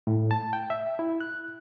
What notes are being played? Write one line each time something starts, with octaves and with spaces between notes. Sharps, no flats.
A2
A5
G5
E5
E4
F#6